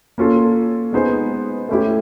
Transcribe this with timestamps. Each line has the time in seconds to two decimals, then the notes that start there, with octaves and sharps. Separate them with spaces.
0.18 A#3 C#4 F4 A4
0.93 G#3 B3 D#4 G#4 C5
1.69 A3 C#4 E4 G4